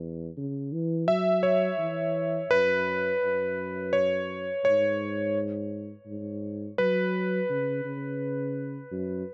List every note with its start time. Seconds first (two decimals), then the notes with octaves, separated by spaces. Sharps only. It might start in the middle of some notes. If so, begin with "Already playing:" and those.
Already playing: E2
0.37 C#3
0.72 E3
1.07 F#3 E5
1.43 C#5
1.78 E3
2.50 F#2 B4
3.22 F#2
3.93 C#5
4.64 G#2 C#5
6.06 G#2
6.78 F#3 B4
7.49 C#3
7.85 C#3
8.91 F#2